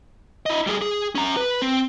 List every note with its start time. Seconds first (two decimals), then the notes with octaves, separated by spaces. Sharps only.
0.46 E4 D#5
0.67 G3 G#4
0.82 G#4
1.15 C#4 A#5
1.37 B4
1.62 C4